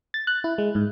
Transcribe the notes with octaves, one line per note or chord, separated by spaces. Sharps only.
A6
F#6
E4
G#3
G#2